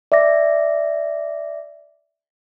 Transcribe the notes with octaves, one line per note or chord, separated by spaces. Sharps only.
D5 E5 D6 A#6